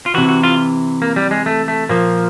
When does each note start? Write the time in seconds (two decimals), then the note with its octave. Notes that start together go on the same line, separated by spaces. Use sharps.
0.06 F4
0.14 C3 E3 F#4
0.29 F#4
0.43 F4
1.02 A#3
1.16 G3
1.31 G#3
1.46 A3
1.68 A3
1.89 A#2 F3 A#3